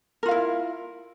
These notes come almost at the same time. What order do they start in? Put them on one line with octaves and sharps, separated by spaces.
A#4 F4 F5 E4